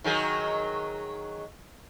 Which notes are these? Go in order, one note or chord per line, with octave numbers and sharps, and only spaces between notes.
D#3 F#3 G#4